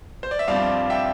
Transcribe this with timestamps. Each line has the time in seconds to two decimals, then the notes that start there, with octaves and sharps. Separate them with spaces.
0.23 C5
0.31 D5
0.39 E5
0.48 G2 F3 C4 D5 F5
0.90 E5 G5